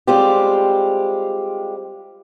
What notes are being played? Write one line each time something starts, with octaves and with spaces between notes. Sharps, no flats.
G3 G#3 C4 F4 G4